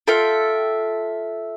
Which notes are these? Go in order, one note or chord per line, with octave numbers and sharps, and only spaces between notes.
F4 A4 E5 G5